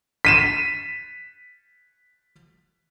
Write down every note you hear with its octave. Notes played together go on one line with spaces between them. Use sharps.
B6 D#7 E7